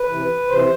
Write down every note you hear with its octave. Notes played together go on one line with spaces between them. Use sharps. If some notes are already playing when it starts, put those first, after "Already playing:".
Already playing: B4
C3 E3
C3 E3 C5